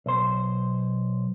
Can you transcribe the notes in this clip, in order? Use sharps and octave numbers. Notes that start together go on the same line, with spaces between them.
B1 C5